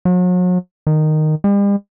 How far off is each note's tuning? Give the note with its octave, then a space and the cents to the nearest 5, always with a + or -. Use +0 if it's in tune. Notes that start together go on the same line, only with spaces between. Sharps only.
F#3 -40
D#3 -10
G3 +45